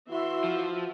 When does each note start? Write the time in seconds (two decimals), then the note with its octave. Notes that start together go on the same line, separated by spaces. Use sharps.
0.11 E3 E4 F#4 E5 C6
0.44 F3